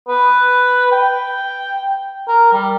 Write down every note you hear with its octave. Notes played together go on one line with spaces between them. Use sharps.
B4
G5
A#4
G3